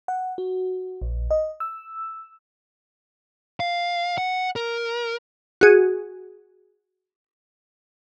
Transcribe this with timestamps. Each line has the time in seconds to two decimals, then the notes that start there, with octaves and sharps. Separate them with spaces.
0.08 F#5
0.38 F#4
1.02 A#1
1.31 D#5
1.60 E6
3.60 F5
4.18 F#5
4.56 A#4
5.61 F#4 G#4